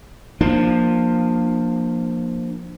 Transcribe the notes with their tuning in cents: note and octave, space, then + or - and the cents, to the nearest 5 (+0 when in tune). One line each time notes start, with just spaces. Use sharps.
F3 +0 A#3 +10 D4 +25